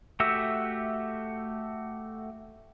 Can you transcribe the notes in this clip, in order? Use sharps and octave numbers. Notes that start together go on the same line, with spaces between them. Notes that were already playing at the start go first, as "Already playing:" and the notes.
A3 F#4 G4 E5